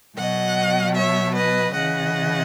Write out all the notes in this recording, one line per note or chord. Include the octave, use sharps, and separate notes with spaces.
B2 F#3 D#5 F#5
C#5 E5
B4 D#5
C#3 E3 D#5 F#5